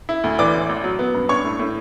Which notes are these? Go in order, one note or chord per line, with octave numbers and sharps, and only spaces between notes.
E4
D2
E3 D5 D6
A1
A1
F#3
B3
G2
D4 C#5 C#6
A2
A2